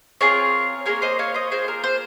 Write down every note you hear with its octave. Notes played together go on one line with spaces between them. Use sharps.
C4 F4 G#4 A#4 C#5
A#3 D#4 G#4 A#4 C#5
C5 D#5
C#5 F5
C5 D#5
A#3 F4 G#4 C5
A#4
C5